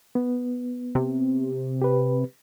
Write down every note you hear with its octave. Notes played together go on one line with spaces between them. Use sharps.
B3
C3
G4 B4